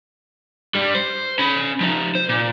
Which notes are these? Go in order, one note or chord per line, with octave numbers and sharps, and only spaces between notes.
G2 G3
C5
C#4 B5
F3 D#4
C5
A#2